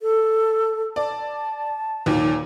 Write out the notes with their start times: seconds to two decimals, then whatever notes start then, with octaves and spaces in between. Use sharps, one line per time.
0.01 A4
0.96 D5 A5
2.06 D#2 A#2